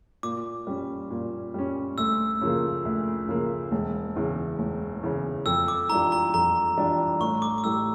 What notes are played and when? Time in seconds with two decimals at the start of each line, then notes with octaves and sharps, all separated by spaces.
0.23 A#2 D6
0.67 G3 C#4
1.11 A#2
1.54 G3 C#4
1.98 D2 E6
2.41 C#3 F3 A#3
2.85 D2
3.29 C#3 F3 A#3
3.72 E1
4.16 E2 C#3
4.59 E1
5.03 E2 C#3
5.46 F2 E6
5.68 D6
5.89 E3 G3 D4 F4 A#5
6.12 A#5
6.34 F2 A#5
6.77 E3 G3 D4 F4
7.20 A1 C#6
7.42 D6
7.58 D6
7.64 A2 G3 E6